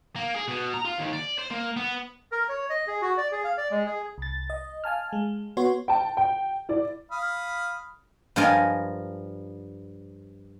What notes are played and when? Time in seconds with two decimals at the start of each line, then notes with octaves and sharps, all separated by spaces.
0.16 A#3
0.34 G#4
0.48 B2
0.74 A#5
0.85 F4
0.99 D#2
1.13 D5
1.38 C5
1.51 A#3
1.77 B3
2.32 A#4
2.49 C#5
2.70 D#5
2.87 G#4
3.02 F#4
3.18 D5
3.32 G#4
3.44 F5
3.58 D5
3.71 G#3
3.86 G#4
4.18 C2 A6
4.50 D#5
4.84 F5 G#5 A5 F6
5.13 G#3
5.57 B3 F#4 C#5 C6
5.88 G5 A5
6.17 G5
6.69 E4 D5
7.12 F5 B5 D#6
8.36 G2 F3 F4 A#4 D#5 G#5